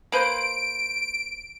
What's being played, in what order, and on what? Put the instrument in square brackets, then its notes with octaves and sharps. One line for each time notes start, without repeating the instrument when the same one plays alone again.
[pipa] A#3 B4 C5 [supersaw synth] D7